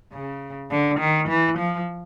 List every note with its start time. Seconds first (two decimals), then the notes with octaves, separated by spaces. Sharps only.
0.13 C#3
0.70 D3
0.99 D#3
1.28 E3
1.58 F3